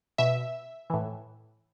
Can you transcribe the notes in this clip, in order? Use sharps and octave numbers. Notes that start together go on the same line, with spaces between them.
B2 E5
A2 E3